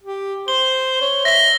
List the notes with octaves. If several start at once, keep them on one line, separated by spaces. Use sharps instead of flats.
G4
C5 G7
C#5
E5 A#6 G7